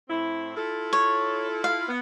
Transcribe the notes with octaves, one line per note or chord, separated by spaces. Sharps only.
A2 C4 E4
E4 F4 A4
C#5
F5
B3